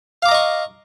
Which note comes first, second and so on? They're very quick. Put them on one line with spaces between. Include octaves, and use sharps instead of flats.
F5 D6 A#5 D#5 C#6